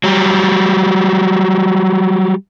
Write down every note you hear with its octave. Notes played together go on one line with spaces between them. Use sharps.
F#3 G3